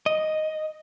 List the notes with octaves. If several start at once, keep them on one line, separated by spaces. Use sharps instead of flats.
D#5